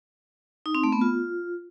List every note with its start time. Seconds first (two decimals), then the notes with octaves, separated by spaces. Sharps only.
0.66 D#4
0.75 C4
0.84 A3
0.92 B3
1.01 F4